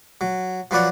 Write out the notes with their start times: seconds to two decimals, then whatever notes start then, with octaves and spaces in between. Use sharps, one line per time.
0.21 F#3
0.71 F3 F#3 B4 D5 F#5